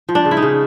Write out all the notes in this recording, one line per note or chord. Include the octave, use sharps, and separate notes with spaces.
F3
D4
C#3
E4
D#4
C#3